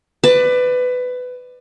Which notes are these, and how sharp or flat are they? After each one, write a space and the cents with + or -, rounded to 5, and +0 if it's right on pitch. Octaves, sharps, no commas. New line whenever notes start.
B4 +20 D5 +25